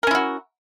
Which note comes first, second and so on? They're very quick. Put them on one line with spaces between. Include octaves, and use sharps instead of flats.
A#4 C#4 E4 F#4